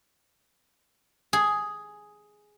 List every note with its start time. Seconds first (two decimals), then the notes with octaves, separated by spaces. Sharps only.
1.33 G#4